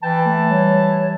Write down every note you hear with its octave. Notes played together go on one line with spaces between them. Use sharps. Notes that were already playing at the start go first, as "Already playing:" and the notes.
E3 G5 A5
A3
G3 C#5